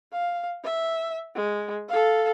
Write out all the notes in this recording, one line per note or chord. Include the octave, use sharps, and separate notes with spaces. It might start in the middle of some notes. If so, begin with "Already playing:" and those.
F5
E5
G#3
A4 F5